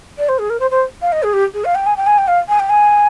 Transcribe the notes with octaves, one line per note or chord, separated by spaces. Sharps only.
D5
C5
G#4
A#4
C5
C5
F5
D#5
G#4
G4
G#4
F5
G5
G#5
G5
G#5
G5
F5
G#5
G5
G#5